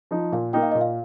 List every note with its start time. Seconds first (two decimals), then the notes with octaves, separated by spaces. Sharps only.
0.11 F3 D#4
0.32 A#2 F5
0.53 A#3 D#4 G5
0.63 F5
0.72 A#2 D#5
0.81 F5